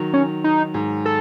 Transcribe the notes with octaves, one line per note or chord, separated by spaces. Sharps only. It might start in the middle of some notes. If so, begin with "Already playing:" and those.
Already playing: D#3 F#3
C#4
D#4
G#2
A4